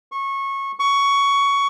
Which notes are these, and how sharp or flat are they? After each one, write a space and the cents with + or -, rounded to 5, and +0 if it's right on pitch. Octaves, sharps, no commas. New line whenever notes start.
C#6 -20
C#6 +15